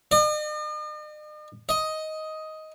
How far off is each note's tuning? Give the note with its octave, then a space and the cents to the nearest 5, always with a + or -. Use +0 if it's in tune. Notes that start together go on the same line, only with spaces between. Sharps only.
D#5 -45
D#5 +10